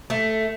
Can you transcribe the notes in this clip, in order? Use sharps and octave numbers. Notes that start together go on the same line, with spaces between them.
A3